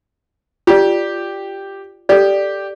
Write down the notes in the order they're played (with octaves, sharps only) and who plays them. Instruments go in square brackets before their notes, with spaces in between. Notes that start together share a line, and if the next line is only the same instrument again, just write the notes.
[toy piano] F4 D5 [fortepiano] G4
[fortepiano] G4 [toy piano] A4 D5